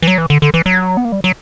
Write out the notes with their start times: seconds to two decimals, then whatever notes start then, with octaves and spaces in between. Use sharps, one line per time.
0.02 E3
0.07 F#3
0.18 E3
0.30 D3
0.42 D3
0.54 E3
0.66 F#3
0.97 B3
1.05 A#3
1.12 G3
1.24 F#3